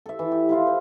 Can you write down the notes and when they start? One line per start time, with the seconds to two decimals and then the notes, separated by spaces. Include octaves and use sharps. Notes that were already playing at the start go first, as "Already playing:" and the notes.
0.06 A4 E5
0.19 E3
0.32 G4
0.49 E4 F4 F5
0.67 C5